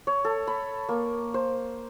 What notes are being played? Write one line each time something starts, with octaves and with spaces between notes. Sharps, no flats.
C#5
A4
B5
A#3
C5